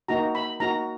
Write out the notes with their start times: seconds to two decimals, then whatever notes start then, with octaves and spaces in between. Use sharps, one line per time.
0.08 A#3 D#4 F#4 A#5
0.35 B5
0.60 A#3 D#4 F#4 A#5